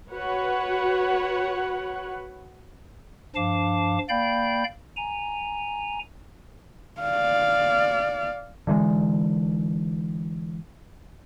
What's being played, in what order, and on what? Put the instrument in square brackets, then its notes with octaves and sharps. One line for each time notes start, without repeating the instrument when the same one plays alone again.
[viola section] F#4 B4 C#5 F#5
[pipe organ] G2 F3 D4 F5 A5 D6
A#3 D5 F5 G5 B5 G6
G#5 A#5
[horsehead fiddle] D5 F5
[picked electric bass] D3 E3 G3 G#3